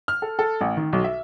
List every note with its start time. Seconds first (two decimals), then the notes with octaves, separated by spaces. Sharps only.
0.08 F6
0.22 A4
0.39 A4
0.61 A1
0.77 D#3
0.93 B1
1.04 E5